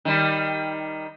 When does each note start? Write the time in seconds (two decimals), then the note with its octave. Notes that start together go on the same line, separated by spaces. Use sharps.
0.05 D#3 G3